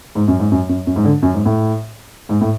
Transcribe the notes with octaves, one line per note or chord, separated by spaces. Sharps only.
G#2
F#2
G#2
F#2
F#2
F#2
G#2
D3
F#2
G#2
A2
G#2
A2